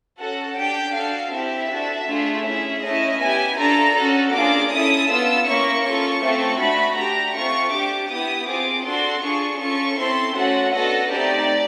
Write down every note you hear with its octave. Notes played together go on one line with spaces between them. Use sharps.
C#4 F#4 A4 F#5
D4 G4 G5
D4 F#4 A4 F5
C4 E4 G4 E5
D4 F#4 A4
A3 D4 F4 G#4
C#4 E4 G#4 E5
A3 C#4 E4 D#5
B3 E4 G4 G#5
D4 F4 A4 A#5
C#4 F#4 A4
A#3 D4 F4 G#4 D6
C#4 E4 A4 D#6
B3 D4 F4 E6
A#3 C#4 E4 C#6
C#4 F4 A4 C#6
A3 C4 F4 A4
A3 D4 F#4 B5
D4 G4 A#5
A3 C4 F4 C#6
D4 G4 D6
B3 E4 G4 D#6
C4 F4 G#4 D6
D4 F#4 A4 C6
D4 F4 G#4 C#6
C#4 F4 A4 C#6
C4 E4 A4 C6
A3 C#4 F#4 A4 F#5
B3 D4 F#4 A4 D#5
A3 C4 D#4 G4 D5